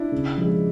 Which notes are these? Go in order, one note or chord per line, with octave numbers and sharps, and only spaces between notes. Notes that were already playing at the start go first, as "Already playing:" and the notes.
Already playing: D4 E4
C#3
F3 G#3